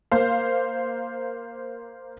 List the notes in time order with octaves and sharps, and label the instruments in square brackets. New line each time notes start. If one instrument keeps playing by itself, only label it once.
[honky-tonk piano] A#3 C5 F5